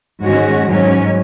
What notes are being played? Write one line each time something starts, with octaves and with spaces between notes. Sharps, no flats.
G#2 D#3 G#3 C#4 F#4
G#2 F#3 C#4